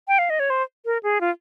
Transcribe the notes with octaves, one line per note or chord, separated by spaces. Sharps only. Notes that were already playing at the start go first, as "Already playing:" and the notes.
G5
F5
D#5
C#5
C5
A#4
G#4
F4